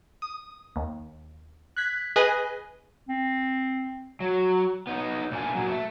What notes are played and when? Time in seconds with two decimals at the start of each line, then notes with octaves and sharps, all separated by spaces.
0.22 D#6
0.76 D#2
1.77 F#6 G#6 B6
2.16 G#4 B4 D#5 G#5
3.09 C4
4.20 F#3
4.87 B3 D#4
5.32 A#2 E3 A#3 D4 G#5
5.55 A#2 F#3
5.69 A3